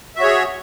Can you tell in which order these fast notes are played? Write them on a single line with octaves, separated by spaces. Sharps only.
E5 F#4 C#5 G#4